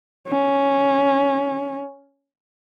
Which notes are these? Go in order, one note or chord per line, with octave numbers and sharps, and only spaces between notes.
C#4